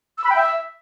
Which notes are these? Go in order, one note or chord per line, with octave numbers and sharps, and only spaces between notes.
E6
B5
G5
E5